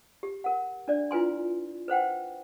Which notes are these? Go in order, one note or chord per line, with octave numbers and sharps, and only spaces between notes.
G4
A#4 F#5
D4 D5
E4 F4 B4 G#5 C6
B4 C5 F#5 G5